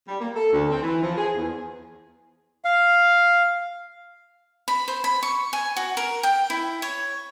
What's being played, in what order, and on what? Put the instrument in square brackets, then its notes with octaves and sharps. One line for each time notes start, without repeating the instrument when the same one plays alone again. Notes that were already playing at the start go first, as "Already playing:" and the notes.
[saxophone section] G3
A#3
A4
D2
C4
E3
F3
G#4
E2
[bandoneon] F5
[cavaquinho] B5
C5
B5
C#6
G#5
F#4
A#4
G5
E4
C#5